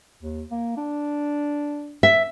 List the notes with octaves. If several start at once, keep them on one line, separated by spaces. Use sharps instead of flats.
D#2
A#3
D4
E5